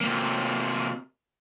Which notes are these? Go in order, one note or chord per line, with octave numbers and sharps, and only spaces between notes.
C3 A#3